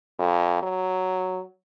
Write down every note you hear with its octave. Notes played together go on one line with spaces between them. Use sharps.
F2
F#3